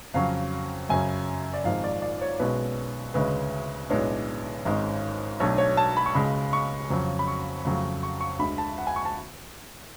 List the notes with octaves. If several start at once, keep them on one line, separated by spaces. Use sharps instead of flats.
F2 C#3 F#3 C#4 F5
F#2 C#3 F#3 C#4 G#5
D5
G#1 G#2 F3 G#3 F5
D5
D5
C#5
B1 B2 G#3 C#4 B4
D2 C#3 G#3 C#4 B4
B1 A2 G#3 B3 D4 C#5
G#1 G#2 G#3 C#4
B1 B2 F#3 A3 D4 C#5
C#5
A5
B5
C#6
C#2 C#3 G#3 B5
C#6
F2 C#3 F#3 C#4
B5
C#6
F2 C#3 F#3 A3
C#6
C#6
D2 D3 G#3 B5
A5
F#5
G#5
C#6
A5